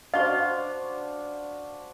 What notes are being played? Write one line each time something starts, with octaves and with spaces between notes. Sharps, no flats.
D4 F#4 C5 D#5 F5 C#6